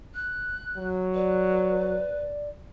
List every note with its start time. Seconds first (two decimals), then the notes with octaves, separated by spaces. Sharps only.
0.14 F#6
0.77 F#3
1.15 B4 D5